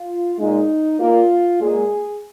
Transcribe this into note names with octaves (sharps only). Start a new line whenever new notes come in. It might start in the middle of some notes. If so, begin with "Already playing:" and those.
Already playing: F4
A#2 G#3 D#4
A#2 A#3 F4
A#2 G#3 G#4